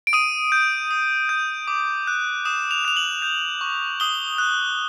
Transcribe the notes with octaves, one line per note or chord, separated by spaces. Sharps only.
D7
D#6 D#7
G6
D#6
G6
D6
F#6
D#6 E7
F7
F#6 F7
F#7
G6
C#6
D#6 G7
F#6